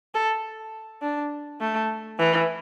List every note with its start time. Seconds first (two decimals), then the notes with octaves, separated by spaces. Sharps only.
0.14 A4
1.02 D4
1.61 A3
2.19 E3